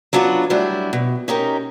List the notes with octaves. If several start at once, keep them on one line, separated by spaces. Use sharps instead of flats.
F#3 B3 D4 F4 D#5 F#5
F#3 G3 A3 D4 E4
B2
C#4 D#4 G4 A#4